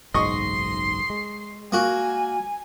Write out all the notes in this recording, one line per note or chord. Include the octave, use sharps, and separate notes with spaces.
F#1 B1 G#2 D#5 C6 C#6 C7
G#3
A#3 F#4 G#5